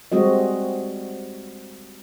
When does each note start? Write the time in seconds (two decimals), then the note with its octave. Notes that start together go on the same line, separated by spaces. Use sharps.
0.12 G3 G#3 C4 F#4 D#5